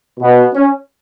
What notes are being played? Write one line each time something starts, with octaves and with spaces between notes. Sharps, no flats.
B2 B3
C#4